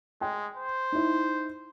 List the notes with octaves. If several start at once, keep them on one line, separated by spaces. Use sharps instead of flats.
G#3 G5
C5
D#4 E4